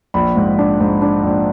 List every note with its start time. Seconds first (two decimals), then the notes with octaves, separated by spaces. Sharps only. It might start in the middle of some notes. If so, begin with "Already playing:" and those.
0.14 A#1 B5
0.36 G#2
0.59 D4
0.80 G#2
1.02 D4
1.24 A#1